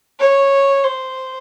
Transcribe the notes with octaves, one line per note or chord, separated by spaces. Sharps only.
C#5
C5